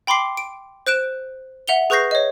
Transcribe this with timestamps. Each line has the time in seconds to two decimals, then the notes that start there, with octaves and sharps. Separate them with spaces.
0.07 G5 B5 C6 D6 C7
0.37 D7
0.87 C5 F#6 D7 E7
1.68 E5 F#5 F7 G7
1.90 G#4 B4 C#6 G6 A#6 C7
2.11 C#5 D#5